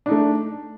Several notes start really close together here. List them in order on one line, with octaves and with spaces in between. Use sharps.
D4 D#4 A3